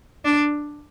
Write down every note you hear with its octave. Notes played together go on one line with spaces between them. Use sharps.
D4